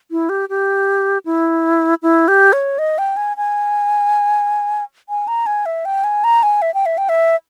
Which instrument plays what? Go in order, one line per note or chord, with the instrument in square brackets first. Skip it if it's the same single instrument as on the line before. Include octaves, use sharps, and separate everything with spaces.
[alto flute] E4
G4
G4
E4
E4
G4
C#5
D#5
G5
G#5
G#5
G#5
A#5
G#5
E5
G5
G#5
A#5
G#5
E5
G5
E5
G5
E5